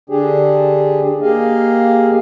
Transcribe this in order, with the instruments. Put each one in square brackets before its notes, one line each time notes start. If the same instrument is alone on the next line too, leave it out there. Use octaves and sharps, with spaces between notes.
[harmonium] D3 D4 G4 G#4
A#3 G4 G#4 D#5 F5